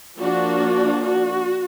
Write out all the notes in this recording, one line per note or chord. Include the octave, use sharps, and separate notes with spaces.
F3 A#3 D4 F#4
F#4